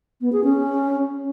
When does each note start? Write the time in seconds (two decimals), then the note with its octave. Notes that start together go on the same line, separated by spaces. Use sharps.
0.21 B3
0.32 G#4
0.44 C#4